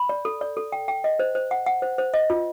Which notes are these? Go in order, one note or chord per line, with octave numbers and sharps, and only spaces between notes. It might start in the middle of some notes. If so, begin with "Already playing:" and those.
Already playing: B5
D5
A4
D5
A4
G5
G5
D#5
C5
C5
F#5
F#5
C5
C5
D#5
F4